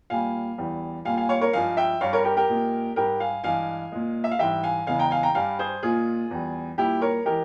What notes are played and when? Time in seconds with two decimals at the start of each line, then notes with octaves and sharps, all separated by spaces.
0.10 A#2 G3 F5 G#5
0.58 E2 E3 G3
1.05 A#2 G3 F5 G#5
1.17 F5 G#5
1.29 C#5 F5
1.41 A#4 C#5
1.53 G2 F3 G#3 F5 G#5
1.77 E5 G5
2.01 G2 G3 C#5 F5
2.13 A#4 C#5
2.24 G4 A#4
2.37 G4 A#4
2.49 A#2 G#3
2.96 G#2 G3 G4 A#4
3.20 F5 G#5
3.44 G2 E3 G#3 F5 G#5
3.92 A#2 G#3
4.24 E5
4.31 F5
4.39 G#2 E3 G3 E5 G5
4.63 F5 G#5
4.87 E2 C#3 E3 G#3 F5 G#5
4.99 G5 A#5
5.11 F5 G#5
5.23 G5 A#5
5.34 G2 G3 F5 G#5
5.59 G#4 C5
5.83 A#2 G#3 F4 G#4
6.31 E2 E3 G3
6.78 A#2 G3 E4 G4
7.02 A#4 C#5
7.25 E3 G#3 G4 A#4